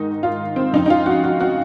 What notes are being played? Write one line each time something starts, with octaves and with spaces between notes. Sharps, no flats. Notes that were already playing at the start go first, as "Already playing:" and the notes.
Already playing: G#2 D#3 D#4
F4
C4
F2 C#3 D#4
D#4
F4
F#4
F#4
F#4